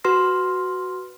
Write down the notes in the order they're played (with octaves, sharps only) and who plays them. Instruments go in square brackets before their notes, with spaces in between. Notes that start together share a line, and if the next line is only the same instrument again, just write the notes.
[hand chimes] F#4 B4 C6 F6 A#6